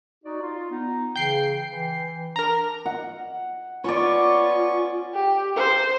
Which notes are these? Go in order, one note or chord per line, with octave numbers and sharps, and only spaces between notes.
D#4 F#4 D5
F4
B3 D#4
C#3 E3 G5 C7
E3
D4 A#4 A#5
F#5
B3 C#4 F4 C#5 D5 C#6
G4
C5